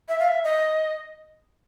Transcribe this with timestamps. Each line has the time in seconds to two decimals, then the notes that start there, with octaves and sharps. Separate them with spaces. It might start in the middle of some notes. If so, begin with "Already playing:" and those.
0.09 E5
0.19 F5
0.28 E5
0.44 D#5